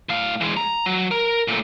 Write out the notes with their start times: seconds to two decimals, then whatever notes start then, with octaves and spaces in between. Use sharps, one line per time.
0.09 A2 F5
0.41 E3 G#3
0.57 A#5
0.86 F#3
1.11 A#4
1.48 A#2 A3